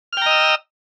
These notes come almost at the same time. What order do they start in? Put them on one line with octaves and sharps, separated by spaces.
F6 G5 A#5 D#5 E6